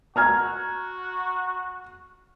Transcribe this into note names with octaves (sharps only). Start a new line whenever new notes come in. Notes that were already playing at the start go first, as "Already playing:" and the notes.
F#4 A#5 F6 G#6